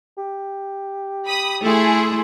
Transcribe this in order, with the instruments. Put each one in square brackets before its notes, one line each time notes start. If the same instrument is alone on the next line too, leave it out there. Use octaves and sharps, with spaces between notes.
[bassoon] G4
[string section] B5 D#6
[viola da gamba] A3 E4 [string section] G#4 [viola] A4 C6